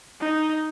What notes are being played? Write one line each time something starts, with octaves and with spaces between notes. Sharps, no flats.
D#4